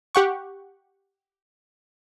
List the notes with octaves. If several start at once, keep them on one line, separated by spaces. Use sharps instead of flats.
G4 F#5 C#6